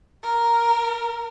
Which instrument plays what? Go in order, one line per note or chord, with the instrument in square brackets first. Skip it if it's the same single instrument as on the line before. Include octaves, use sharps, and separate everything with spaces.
[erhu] A#4